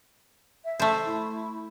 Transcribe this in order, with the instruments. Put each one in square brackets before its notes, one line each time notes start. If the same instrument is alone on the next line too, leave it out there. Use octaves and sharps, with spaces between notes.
[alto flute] E5
[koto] A3 C5
[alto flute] E4